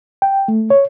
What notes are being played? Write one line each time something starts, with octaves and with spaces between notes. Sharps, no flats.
G5
A3
C#5